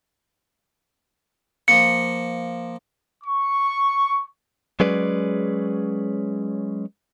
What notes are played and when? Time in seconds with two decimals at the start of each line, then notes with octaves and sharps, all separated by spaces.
1.68 F3 A#3 C#7
3.24 C#6
4.80 F#3 G#3 C#4 G#4 B4 D5